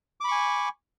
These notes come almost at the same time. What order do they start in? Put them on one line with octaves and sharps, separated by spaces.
D6 B5 C#6 G#5